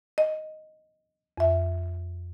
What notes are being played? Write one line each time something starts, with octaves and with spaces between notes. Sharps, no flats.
D#5
F2 E5